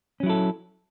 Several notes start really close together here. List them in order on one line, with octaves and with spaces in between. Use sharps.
C#4 F#3 E4 A4